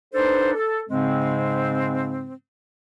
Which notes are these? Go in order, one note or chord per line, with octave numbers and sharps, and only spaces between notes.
D4 D#4 A4 B4 C5
A4
G#2 C#3 G#3 C4